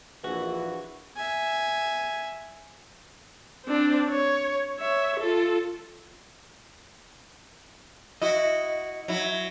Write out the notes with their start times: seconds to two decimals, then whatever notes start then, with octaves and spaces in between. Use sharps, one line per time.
0.24 A#1 E3 F#4
1.16 E5 G#5
3.65 C4 D4
4.10 C#5
4.79 C#5 E5
5.20 F4 A4
8.22 E4 F#4 D#5
9.08 F#3 E4